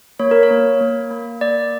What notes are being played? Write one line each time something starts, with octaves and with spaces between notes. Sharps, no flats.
A#3 C#5
A#4
C#5
A#3
A#3
A#3
A#3 D5